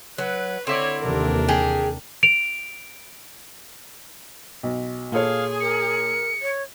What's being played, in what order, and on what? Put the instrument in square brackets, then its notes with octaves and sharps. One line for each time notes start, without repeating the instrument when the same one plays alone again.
[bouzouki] F#3 [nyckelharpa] B4
[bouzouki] D3 [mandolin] C4 E4 D5 [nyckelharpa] C#5
[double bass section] D#2 C3 E3 [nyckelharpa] D4 A#4
[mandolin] G4 [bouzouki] G#4
[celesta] D7 F7
[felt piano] B1
[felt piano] A#2 A4 C#5 [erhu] G#4 [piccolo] F5
[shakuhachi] A#4 [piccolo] C#7
[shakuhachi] C#5